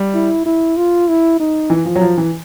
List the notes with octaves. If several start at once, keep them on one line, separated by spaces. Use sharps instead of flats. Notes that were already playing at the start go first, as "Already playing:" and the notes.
Already playing: G3
E4
E4
F4
E4
D#4
E3
F3
F#3
F3
E3